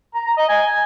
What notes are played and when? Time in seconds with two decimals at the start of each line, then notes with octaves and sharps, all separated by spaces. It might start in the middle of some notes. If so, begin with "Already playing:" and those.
0.14 A#5
0.26 A#5
0.37 D#5
0.49 G#5